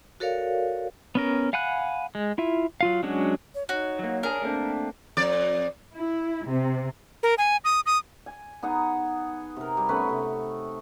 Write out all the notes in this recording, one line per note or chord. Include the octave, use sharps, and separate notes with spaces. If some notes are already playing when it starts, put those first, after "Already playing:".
F#4 A4 A#4 C#5 D5 F5
B3 C#4 A#4
F5 F#5 G#5 B5 F#6
G#3
E4 F4 E5
F#3 F4 F5
F#3 G#3 C#4 D4 F#4
C#5
D#4 F#4 C#5
F#3 A#3
D4 G#4 A#4
A3 A#3 C4 D4
F2 D5
E4
C3
A#4
G#5
D#6
D#6
G#5
B3 D#4 G#4 F#5
C3 A#4
G3
A3 B3 C#4 B4
C3